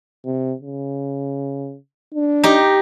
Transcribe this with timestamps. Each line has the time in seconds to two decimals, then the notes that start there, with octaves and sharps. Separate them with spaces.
0.25 C3
0.62 C#3
2.14 D4
2.44 D#4 G4